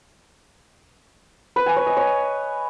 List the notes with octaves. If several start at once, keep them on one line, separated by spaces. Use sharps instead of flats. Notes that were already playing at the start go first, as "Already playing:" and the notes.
B4
G#5
C#5
D#5
C#5